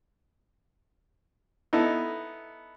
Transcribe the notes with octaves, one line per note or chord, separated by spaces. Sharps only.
B3 D#4 E4 A4